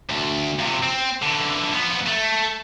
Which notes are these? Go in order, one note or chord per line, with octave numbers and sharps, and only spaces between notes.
D2
F2 C3
C4
D3 E3
F3 B3
A3